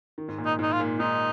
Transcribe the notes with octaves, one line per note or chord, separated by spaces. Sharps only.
D#3
G#2
A#2
D#4
G#2 D#4
F4
A#2
G#2 D#4